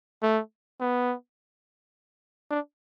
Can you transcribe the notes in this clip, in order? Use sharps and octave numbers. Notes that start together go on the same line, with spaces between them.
A3
B3
D4